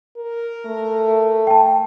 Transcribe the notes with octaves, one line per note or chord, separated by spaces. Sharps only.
A#4
A3
G5 A5